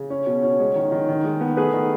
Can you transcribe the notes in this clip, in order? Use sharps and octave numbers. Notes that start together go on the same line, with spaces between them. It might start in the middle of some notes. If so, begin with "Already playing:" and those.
Already playing: C#3
C#4
B2
C#4
G#3
D#3
D#3
D#3
G#3
B3
A3 G#4 B4
D#3